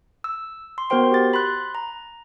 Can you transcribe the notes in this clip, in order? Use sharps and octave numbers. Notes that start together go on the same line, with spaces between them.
E6
C6
B3 F#4 A#4 C5 G5 C6
G4 A6
B5 C6 F#6
A#5